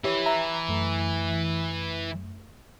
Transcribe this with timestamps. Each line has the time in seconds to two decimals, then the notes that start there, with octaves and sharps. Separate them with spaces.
0.04 E3 E4 G4 B4 C#5
0.26 E5 A#5
0.69 F#2 A3